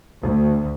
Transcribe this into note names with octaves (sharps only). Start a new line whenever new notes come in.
D2